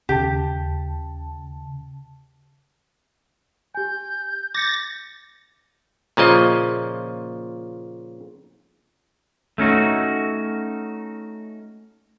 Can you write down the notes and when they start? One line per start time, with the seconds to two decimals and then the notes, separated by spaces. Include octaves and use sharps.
0.09 D#2 C#3 G4 A5
3.75 G4 G#5 G6
4.55 D6 G6 A6 A#6 C#7
6.17 A#2 C#3 F3 D#5
9.58 A3 C#4 D#4 F#4